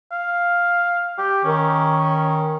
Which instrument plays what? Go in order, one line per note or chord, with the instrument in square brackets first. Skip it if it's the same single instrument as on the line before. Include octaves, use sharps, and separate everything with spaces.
[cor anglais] F5
G4
[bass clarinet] D#3 [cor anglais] C#4